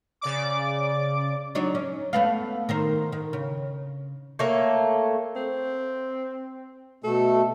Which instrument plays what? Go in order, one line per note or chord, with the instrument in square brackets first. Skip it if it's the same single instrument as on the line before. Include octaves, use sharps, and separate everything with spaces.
[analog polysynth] C#3 D5 D6
[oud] F#3 D4 D#4
C#4
A3 B3 F5
D#3 A#4 C5
D#3
C#3
[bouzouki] A3 A#3 C#5
[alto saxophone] C4
[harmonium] B2 A3 [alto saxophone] A4